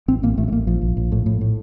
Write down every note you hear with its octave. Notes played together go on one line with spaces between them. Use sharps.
A1 C4
A1 A#3
A1 A3
A3
A1 A#3
A#1 F3
A#1
A#1
A2
A2
A2